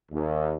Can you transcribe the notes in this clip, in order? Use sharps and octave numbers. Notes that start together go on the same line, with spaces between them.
D#2